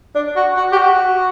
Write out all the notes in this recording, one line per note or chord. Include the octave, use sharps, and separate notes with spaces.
D4
F#4
F#4
G4
F#4